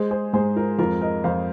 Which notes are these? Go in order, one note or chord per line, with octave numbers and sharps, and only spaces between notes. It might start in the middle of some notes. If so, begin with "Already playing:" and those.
Already playing: G#3 G#4 C5
G#4 C5
G#2 G#4 C5
F4 A#4
F2 F4 A#4
A#4 D#5
F2 C5 F5